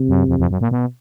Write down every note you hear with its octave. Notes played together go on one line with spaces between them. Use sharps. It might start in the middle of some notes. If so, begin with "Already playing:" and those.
Already playing: C3
F#2
F2
F2
F#2
A#2
B2